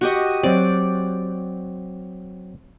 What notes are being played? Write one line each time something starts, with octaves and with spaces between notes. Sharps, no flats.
F#4 G4 D#5
F#3 C4 D5